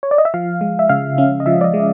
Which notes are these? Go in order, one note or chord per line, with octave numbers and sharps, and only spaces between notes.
C#5
D5
D#5
E5
F3 F5
G#3
E5
C#3 F5
C#4
D#5
F3 E5
D5
D#5
G#3